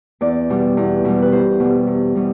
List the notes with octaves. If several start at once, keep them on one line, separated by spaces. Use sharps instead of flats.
E2 D5
B2 G3
E2
B2 G3
B4
E2 C5
B2 G3
E2
B2 G3